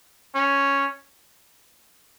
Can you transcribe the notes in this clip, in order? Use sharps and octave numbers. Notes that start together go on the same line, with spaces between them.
C#4